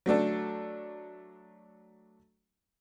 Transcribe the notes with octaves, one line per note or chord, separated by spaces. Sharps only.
F#3 A3 D4 A4